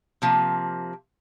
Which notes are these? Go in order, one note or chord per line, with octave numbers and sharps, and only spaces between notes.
C3 F3 A#3